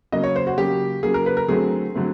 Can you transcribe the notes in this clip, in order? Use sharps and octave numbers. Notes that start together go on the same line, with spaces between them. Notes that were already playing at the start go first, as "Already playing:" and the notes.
C#3 F#3 A#3 D#5
C#5
C5
F#4
C#3 F#3 A#3 G4
C#3 F#3 A#3 G#4
A#4
B4
A#4
D3 F#3 A3 C4 G#4
D3 F#3 A3 C4